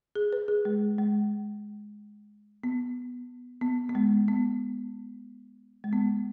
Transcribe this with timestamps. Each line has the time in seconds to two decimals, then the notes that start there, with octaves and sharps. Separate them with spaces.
0.15 G#4
0.33 B4
0.48 G#4
0.65 G#3
0.98 G#3
2.64 B3
3.61 B3
3.89 B3
3.95 G#3
4.28 B3
5.84 G#3
5.93 B3